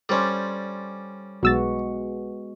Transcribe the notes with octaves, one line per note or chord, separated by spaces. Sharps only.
G3 C#4 A4 C5 D5
B1 G#3 B3 F#4 E6 A6